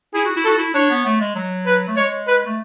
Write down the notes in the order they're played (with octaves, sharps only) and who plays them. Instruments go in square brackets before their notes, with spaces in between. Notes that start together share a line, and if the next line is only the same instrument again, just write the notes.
[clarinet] E4 [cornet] G#4
[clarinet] F#4
E4
[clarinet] F#4 [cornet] A4
[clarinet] E4
[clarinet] D4 [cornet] C#5
[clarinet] B3
A3
G#3
F#3
[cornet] B4
[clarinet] A3
[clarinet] G#3 [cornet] C#5
[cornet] B4
[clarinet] A3